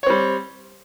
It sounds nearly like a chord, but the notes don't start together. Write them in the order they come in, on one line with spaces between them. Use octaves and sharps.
C#5 C4 G3